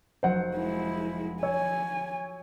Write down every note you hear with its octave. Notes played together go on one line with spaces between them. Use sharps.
F1 F#3 C5 F#5
G#3 E4
C#5 G#5 E6